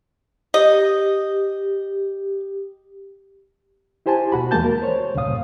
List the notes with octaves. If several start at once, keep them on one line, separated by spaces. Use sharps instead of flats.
G4 D#5
E4 G4 C5 G#5 A5
B2 F#4 B5
D#2 E3 G#3 A#3 A5 G6
A#4
C5 C#5
C#2 G2 A#2 C#3 F5 D#6